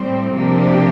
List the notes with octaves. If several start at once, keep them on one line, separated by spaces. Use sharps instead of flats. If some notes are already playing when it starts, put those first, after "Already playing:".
Already playing: A2 G3 C4
C3 F3 A#3 D4 G4